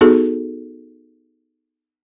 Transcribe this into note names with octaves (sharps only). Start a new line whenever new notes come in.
B3 D#4 F#4 G#4 A4